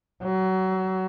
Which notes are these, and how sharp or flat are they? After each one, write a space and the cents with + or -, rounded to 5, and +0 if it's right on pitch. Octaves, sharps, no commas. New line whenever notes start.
F#3 +25